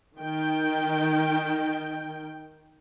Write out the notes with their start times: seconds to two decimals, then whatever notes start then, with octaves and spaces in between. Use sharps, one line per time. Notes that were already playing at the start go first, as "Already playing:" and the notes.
0.18 D#3 G5